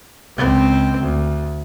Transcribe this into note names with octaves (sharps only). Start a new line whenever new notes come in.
C#2 C4
D2